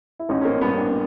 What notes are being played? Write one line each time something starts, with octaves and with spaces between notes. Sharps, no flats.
E4
A1 C#4 D#4
C#4
A#3 C4
G2 B3 C#4
C4 D4